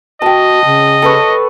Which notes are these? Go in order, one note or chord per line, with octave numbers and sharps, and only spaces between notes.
F#4 D#5 G5 A5
C#3
A4 B4 C#5